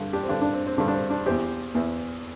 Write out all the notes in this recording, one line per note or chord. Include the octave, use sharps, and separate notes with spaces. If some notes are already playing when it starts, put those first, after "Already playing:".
Already playing: G2 D3
D4 G4
C4
G2 D3 D4
D4
C4
C4
G2 D3 D4
D4
C4
D4
E2 E3 G4 C5
E2 E3